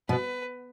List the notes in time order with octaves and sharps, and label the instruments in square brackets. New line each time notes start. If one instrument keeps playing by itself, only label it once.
[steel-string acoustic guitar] B2 [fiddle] B4